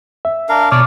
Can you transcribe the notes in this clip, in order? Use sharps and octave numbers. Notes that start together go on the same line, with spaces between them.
E5
D4 A#4 F5
B2 C#5 D5 D6 F6